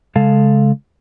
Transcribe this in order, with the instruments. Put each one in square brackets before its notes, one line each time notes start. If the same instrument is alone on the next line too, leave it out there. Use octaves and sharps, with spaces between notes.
[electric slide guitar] C#3 G#3 A4 F5 A5